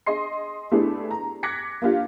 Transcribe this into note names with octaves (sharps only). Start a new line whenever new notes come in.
G#4 D#5 C6 C7
A3 B3 D4 E4 G4 G#4
A#5
D6 F#6 G#6 A#6 B6 C#7
A#3 D4 F4 G4